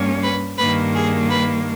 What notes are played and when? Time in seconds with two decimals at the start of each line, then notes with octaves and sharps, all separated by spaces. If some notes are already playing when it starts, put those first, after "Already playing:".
Already playing: G2 G3 A#3 C#4
0.22 B4
0.57 G2 D#3 A#3 B4
0.94 G#4
1.30 B4